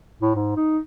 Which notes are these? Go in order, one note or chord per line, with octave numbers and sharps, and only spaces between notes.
A2
G#2
D#4